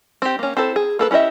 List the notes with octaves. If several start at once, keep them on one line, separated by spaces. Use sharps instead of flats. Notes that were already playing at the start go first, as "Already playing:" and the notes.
C4 G4
A#3 C#4
C4 E4 A4 C5
G#4
A#3 A4 B4
C#4 E4 G4 D#5 E5